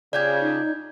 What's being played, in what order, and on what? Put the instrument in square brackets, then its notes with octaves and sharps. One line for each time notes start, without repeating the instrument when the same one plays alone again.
[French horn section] C#3 [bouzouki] D4 F4 G4 [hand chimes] D5 G6 G#6
[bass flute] D#4